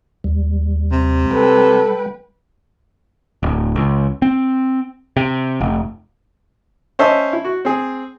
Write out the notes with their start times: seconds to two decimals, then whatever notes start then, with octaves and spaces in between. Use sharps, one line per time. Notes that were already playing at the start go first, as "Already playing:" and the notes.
0.24 D#2 G3
0.92 C3
1.31 G3 A4 B4 G5
3.43 D1
3.76 C#2
4.22 C4
5.17 C3
5.60 F1
6.99 C#4 C5 D#5 E5 A5
7.33 E4
7.44 F#4
7.65 C4 G#4